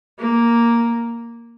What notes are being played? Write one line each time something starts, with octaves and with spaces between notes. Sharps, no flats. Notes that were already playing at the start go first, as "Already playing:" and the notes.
A#3